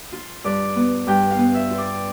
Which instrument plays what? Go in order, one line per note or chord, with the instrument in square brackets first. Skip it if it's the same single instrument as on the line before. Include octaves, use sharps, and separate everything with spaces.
[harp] F4
G2 D5
B3
G2 G5
F5
B3
E5
F4
D5